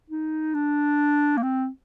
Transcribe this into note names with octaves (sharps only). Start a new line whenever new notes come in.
D#4
D4
A#3
C4